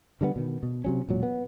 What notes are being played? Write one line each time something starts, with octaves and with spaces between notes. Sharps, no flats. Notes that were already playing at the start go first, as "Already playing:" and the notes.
D3 G3 G#3 B3
B2 D#3
B2
C3 F#3 C#4
E1 A#2 F#3
B3